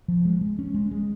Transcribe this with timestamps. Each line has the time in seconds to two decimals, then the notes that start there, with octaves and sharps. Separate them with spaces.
0.08 F3
0.25 G#3
0.41 G#3
0.59 C#4
0.74 G#3
0.91 G#3